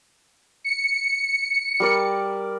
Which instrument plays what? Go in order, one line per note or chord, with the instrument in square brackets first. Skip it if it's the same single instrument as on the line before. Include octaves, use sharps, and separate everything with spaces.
[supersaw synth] C#7
[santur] G3 A#4 D5